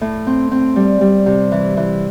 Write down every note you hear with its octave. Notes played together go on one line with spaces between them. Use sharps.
A2
C4
C4
G3
G3
C3
E3
E3